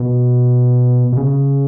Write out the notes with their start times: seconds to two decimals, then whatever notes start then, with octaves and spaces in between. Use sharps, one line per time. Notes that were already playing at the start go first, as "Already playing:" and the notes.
Already playing: B2
1.13 B2
1.17 C#3